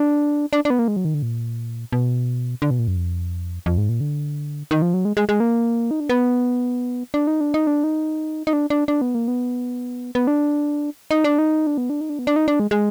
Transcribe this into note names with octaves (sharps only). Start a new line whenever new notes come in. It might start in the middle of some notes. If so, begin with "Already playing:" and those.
Already playing: D4
D4
D4
B3
A#3
G#3
F#3
D#3
D3
A#2
B2
D3
B2
A#2
F#2
F2
F2
G#2
A#2
D3
D#3
F3
F#3
G#3
G#3
G#3
A#3
D#4
D4
B3
D4
D#4
D4
D#4
D4
D#4
D#4
D4
D4
D4
B3
A#3
B3
B3
D4
D#4
D4
D#4
D4
B3
D4
D#4
D4
B3
D4
D#4
D4
G#3
G#3